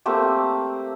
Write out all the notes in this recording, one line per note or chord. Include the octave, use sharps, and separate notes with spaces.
A3 A#3 C4 G4